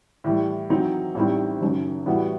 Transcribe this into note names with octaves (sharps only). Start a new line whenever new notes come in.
A2 E3 G3
E2 D#3 F#3 C4 D#4
A1 A2 G3 C4 D#4
F#1 F#2 D#3
A2 E3 G3 B3 F#4